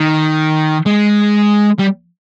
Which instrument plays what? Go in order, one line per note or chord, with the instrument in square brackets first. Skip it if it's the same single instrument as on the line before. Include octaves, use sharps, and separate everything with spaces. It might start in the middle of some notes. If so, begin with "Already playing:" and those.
Already playing: [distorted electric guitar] D#3
G#3
G3